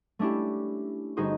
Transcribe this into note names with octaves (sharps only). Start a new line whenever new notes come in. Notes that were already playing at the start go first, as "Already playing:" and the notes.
A3 C#4 D4 E4 G4
G1 D#4 F#4 G#4 C5 D#6